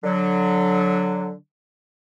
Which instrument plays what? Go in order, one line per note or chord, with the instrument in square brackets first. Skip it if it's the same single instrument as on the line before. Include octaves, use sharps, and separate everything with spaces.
[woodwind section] D3 F#3